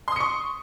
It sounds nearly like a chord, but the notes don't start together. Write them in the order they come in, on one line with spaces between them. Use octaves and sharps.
C6 D#6 C#7 C#6